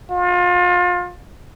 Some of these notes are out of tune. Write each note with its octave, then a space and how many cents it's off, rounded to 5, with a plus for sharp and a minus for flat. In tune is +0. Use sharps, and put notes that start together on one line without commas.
F4 +30